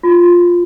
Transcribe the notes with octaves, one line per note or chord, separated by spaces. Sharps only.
F4